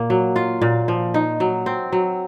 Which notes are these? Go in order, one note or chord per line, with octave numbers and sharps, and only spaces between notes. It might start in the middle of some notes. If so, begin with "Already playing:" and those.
Already playing: A#2 A#3
F#3
F4
A#2
F3
D#4
F#3
C4
F#3